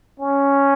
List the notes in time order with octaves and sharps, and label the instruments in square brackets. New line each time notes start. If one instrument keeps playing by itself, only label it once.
[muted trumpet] C#4